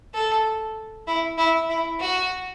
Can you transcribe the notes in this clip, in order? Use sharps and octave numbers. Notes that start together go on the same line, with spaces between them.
A4
E4
E4
E4
F#4